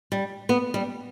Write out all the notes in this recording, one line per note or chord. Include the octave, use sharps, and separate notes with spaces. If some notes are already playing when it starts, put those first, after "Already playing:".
G3
B3
G3